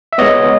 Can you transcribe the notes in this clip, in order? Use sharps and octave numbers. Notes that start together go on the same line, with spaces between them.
E5
G#3 B3 C#5 D#5